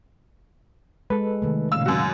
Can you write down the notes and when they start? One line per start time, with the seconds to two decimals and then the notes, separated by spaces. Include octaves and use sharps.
1.10 G#3 A4 B4
1.42 C3 D#3 A3
1.72 A#2 C#3 F5 E6
1.86 F#2 F#4